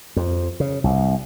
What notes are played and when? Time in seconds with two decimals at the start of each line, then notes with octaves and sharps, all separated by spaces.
0.16 F2
0.60 C#3
0.84 C2